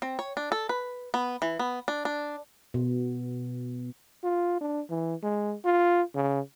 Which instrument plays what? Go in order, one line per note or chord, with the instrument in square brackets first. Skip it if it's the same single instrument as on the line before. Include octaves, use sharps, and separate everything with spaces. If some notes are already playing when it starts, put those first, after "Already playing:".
[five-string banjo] C4
C#5
D4
A4
B4
B3
E3
B3
D4
D4
[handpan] B2
[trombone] F4
D4
E3
G#3
F4
C#3